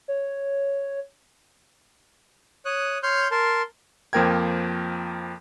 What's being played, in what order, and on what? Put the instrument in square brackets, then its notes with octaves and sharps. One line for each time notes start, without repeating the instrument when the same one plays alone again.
[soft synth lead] C#5
[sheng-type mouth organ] C#5 D#6 F#6
C#5 C6 F6 G6
A#4 A5 C6
[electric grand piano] F2 F3 A#3 A#4 G5 G#6